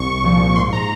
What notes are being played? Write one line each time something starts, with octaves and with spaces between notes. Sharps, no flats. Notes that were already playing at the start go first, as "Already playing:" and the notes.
Already playing: C2 C#6
A#2 F3
G#2 C6
A#5